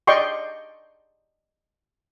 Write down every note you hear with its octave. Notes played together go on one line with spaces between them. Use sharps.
D5 D#5 G5 C6 C#6